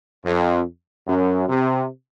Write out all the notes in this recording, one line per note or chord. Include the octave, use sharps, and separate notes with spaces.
F2
F#2
C3